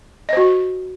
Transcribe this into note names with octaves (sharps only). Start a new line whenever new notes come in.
F#4 C5 D#5